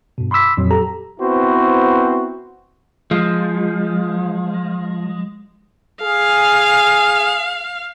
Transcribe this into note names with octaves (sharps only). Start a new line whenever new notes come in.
G2 B2
B5 C6 D6 E6 B6
F2 A#2 F#3
G4 A4 A#5
B3 C4 E4 F#4 B4 C5
F3 G#3
G#4 F5